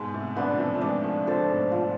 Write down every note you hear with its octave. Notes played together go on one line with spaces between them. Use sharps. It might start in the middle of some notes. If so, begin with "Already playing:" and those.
Already playing: G#2 B2 G#3
A2 C3
B2 D3 B3 D4
F3
C3 E3
F3
E3 G#3 D4
F3 A3
D3 F3 A4 C5
G#2 B2
F3